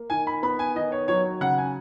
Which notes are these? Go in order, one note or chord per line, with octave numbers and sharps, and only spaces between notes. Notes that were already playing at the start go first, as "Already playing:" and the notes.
Already playing: A#3
D#3 G#5
B5
B3 B5
G#5
D#3 D#5
C#5
F#3 C#5
C#3 F#5
G#5